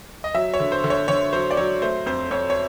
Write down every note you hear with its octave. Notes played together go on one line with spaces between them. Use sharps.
D#5
F#3 E5
C#5
D3
C5
D3
C#5
D3 C#5
F#3 C5
D5
F#3 C#5
A3 C5
F2 C5
F2 C#5
C#5